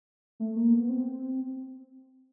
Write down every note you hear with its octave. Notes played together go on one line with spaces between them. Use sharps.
A3
A#3
B3
C4